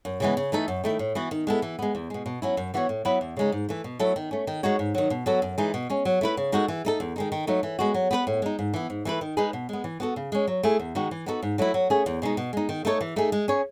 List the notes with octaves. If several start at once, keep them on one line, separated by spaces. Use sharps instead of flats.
F#2
C#3 E3 G#3 B3
C#3
E3 A3 D#4 A4
F#2
D#3 A3 E4
A2
E3 B3 F#4
D#3
G#3 B3 E4 A4
E3
G#3 B3
E2
B2 G#3
B2
F#3 C#4 E4
F#2
E3 B3 F#4 C#5
A2
F#3 B3 E4 B4
E2
C#3 G#3 D#4
G#2
E3 A3
B2
F#3 A3 E4 A4
D#3
A3 C#4
D#3
G#3 D#4 F#4 C#5
G#2
D#3 F#3
B2
F#3 B3 F#4 A4
F#2
E3 G#3 D#4
B2
G#3 C#4
F#3
A3 E4 B4
C#3
G#3 D#4 F#4 A4
E3
A3 D#4 A4
E2
D#3 G#3 D#4
D#3
F#3 A3 D#4
E3
G#3 B3 F#4
F#3
B3 F#4 B4
A2
G#3 D#4
G#2
E3 B3
G#2
E3 A3 E4 B4
D#3
G#3 D#4 G#4 B4
B2
G#3 B3
E3
B3 F#4 A4
C#3
G#3 C#4
F#3
A3 E4 G#4
E2
D#3 G#3 D#4 F#4
E3
B3 D#4 F#4 A4
G#2
F#3 A3 E4
F#3
A3 C#4 G#4
E2
B2 G#3 D#4
B2
G#3 D#4
D#3
A3 D#4 A4 C#5
E3
A3 D#4 G#4
G#3
C#4 G#4 C#5